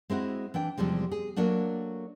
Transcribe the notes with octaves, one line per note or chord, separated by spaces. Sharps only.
G#3 C4 E4 F#4
E3 D4 G5
E2 C3 F3 G3 G#3
G#4
F#3 A3 A#3 D4 F#4